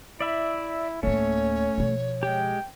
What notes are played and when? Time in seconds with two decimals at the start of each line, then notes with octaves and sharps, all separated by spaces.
0.21 E4 D5 E5 B5
1.03 D1 A3 A#3 C#4 C#5
1.78 B2 F3
2.23 G#3 G4 G5